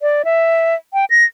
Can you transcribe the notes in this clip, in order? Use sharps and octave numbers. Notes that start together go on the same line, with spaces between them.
D5
E5
G5
A#6